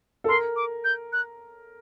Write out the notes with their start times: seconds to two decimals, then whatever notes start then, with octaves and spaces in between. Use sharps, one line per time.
0.24 A4
0.28 A#4 C6
0.56 D6
0.84 G6
1.13 F#6